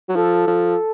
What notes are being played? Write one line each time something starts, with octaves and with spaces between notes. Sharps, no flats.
F#3
F3 A4
F3